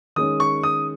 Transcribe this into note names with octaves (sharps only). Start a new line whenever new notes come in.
D#3 G#3 C#4 D#6
C#6
D#6